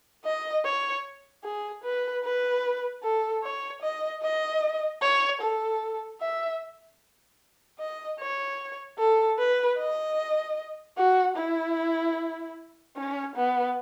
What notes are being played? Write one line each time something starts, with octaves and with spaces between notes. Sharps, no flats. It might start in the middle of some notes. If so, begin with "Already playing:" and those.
D#5
C#5
G#4
B4
B4
A4
C#5
D#5
D#5
C#5
A4
E5
D#5
C#5
A4
B4
D#5
F#4
E4
C#4
B3